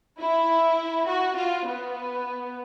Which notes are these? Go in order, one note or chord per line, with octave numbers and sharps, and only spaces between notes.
E4
F#4
F4
B3